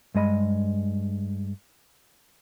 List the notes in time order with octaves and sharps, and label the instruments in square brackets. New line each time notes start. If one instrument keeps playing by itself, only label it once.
[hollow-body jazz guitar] G2 G#3 D#5 B5